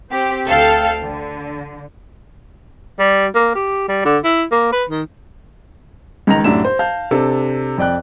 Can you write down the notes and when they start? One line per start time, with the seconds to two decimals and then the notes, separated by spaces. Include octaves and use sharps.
0.11 C4 G4
0.46 D2 A4 F5 G5 A5
1.03 D3
2.99 G3
3.35 A#3
3.55 G4
3.88 G3
4.05 D3
4.24 E4
4.52 A#3
4.72 B4
4.89 D#3
6.27 C#2 D#3 A#5 A#6 F7
6.44 C2 F#2 A2 D4 E5 E7
6.65 C5
6.79 F5 A5 G6
7.11 C3 D4 A4
7.78 F2 D5 G5 F#6